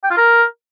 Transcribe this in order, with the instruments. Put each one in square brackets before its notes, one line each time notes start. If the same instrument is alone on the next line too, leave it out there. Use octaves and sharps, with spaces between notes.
[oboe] G5
F4
A#4